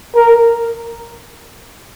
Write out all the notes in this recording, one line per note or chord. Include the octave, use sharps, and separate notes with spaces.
A#4